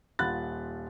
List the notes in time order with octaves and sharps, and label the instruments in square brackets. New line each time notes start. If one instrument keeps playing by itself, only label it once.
[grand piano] D#1 F4 F#5 B5 F#6 A6